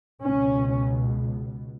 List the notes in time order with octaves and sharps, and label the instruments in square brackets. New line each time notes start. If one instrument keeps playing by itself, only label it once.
[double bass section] C#2 B2 C#4